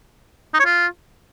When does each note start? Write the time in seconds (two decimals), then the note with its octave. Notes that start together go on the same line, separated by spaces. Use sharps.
0.54 D#4
0.60 C#5
0.65 F4